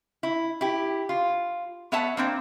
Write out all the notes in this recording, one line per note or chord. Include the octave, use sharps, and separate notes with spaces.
E4
E4 G4
F4
B3 C#5 E5 F#5 A5
A#3 C4 D4